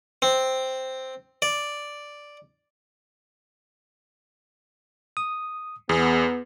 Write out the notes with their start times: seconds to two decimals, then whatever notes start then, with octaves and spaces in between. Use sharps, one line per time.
0.22 C4
1.42 D5
5.17 D#6
5.89 E2 B3 G#4